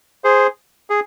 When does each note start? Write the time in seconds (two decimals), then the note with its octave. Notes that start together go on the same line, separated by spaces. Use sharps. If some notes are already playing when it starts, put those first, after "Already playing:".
0.24 G#4 C5
0.90 G#4